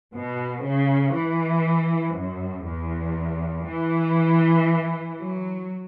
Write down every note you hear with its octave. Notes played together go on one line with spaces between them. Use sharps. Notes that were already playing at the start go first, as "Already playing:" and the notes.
B2
C#3
E3
F#2
E2
E3
F#3